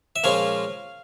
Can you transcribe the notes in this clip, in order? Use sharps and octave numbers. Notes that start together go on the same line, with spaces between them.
E5
A#2 F3 G#3 C#4 F5